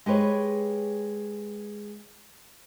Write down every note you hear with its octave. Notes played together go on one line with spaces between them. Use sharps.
G#3 G4 B4 C#5